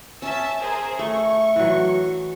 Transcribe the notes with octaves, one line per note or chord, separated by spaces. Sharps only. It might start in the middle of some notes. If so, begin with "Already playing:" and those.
C#4 E5 A5 E6
G#4 A#4 C5
A3 C#6
E3 F#3